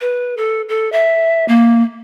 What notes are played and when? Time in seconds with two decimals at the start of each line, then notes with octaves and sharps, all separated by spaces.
0.01 B4
0.37 A4
0.69 A4
0.92 E5
1.48 A#3